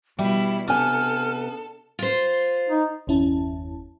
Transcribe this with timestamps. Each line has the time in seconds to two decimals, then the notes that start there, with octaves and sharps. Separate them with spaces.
0.19 B2 G3 E4 G4 E5
0.68 C3 B3 D4 A4 G#5 F6
1.99 F4 C5
2.70 D#4
3.07 G1 E2 C#4 E4 A5